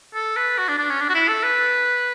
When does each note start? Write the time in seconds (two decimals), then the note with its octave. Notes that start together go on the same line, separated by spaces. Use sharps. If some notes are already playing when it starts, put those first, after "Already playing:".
0.14 A4
0.37 B4
0.58 F#4
0.68 D4
0.78 D4
0.90 C#4
1.01 D4
1.09 F#4
1.14 E4
1.28 A4
1.43 B4